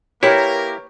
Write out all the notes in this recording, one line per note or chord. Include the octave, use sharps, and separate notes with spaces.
A#3 E4 G4 A#4 B4 C#5